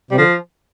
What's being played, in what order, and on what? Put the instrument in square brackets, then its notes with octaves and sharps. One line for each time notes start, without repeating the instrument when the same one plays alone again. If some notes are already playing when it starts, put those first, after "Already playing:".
[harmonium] C3 [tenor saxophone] G3
[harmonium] D3 [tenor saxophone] F3